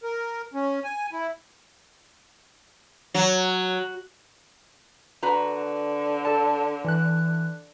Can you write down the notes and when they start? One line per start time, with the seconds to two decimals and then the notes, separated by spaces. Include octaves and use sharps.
0.03 A#4
0.54 C#4
0.84 G#5
1.12 E4
3.14 F#3
5.23 D3 F#4 B4 A#5
6.25 A4 A5
6.85 E3 F#6